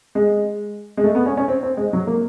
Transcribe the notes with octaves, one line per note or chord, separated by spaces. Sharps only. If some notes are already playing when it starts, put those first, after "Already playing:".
G#3
G#3
A3
B3
C#4
C#4
C4
C4
G#3
F#3
A#3